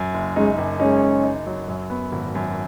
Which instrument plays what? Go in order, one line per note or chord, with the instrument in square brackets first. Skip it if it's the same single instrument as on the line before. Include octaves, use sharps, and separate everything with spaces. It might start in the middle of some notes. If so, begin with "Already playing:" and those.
Already playing: [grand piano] F#2
F#1
[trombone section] G#3 C#4 [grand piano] D#4
[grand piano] F#1
[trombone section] G#3 C#4 [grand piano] D#4
[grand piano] F#1
D#4
F#3
F#2
B3
G#1
F#2